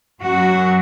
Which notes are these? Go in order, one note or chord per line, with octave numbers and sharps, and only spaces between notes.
F#2 F#3 F#4